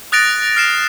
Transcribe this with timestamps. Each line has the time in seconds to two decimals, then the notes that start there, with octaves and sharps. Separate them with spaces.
0.12 D#6 F#6 A6 A#6 D7 F7
0.56 F6 C7 E7